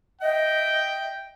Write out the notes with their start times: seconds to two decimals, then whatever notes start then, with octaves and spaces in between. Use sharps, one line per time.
0.21 D#5 E5 G5